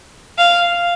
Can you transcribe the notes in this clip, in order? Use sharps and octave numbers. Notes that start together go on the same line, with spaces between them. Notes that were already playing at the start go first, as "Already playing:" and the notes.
F5